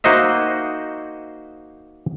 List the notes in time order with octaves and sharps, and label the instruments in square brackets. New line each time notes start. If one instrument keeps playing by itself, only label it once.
[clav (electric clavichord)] A#3 D#4 F#4 C5 D#5 E5